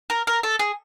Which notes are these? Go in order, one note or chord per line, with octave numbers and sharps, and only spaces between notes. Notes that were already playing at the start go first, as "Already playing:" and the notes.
A#4
A#4
A4
G#4